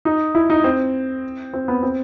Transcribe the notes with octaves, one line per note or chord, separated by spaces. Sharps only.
D#4
E4
D#4
C4
C4
B3
C4